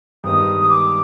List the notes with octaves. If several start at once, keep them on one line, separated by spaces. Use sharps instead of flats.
G2 D#3 G#3 B3 D#4 D#6
D#6
D6